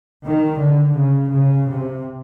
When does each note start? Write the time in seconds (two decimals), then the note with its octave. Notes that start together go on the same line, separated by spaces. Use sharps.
0.26 D#3
0.61 D3
0.99 C#3
1.35 C#3
1.71 C3